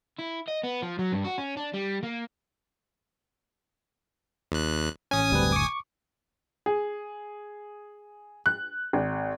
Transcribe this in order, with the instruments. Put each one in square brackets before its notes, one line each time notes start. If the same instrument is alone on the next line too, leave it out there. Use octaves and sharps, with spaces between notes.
[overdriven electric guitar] E4
D#5
B3
F3
F#3
G2
F#4
C#4
D4
G3
A#3
[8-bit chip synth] D#2 F#6
[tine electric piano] A1 C#4 [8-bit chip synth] G#5 D#6
[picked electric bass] F#1 D2 A2 [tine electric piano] G3 C4 B4
[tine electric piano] C#6 D6
[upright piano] G#4
F#6
G#1